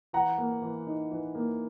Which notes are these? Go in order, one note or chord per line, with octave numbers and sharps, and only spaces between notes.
E3 F#5 A#5
A#3
E3
D#4
E3
A#3